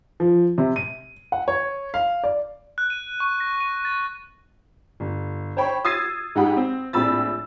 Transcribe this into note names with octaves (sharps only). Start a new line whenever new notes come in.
F3
C3
D#7
F#5
C#5
F5
D5
F#6
D#7
C#6
A#6
D#7
A6
G1
C5 C#5 G5 B5 C#6
D#6 E6 G#6 A6 C7 D#7
G#2 D#4 G4 F#5 B5
C4
A#1 A2 C4 B5 E6 A6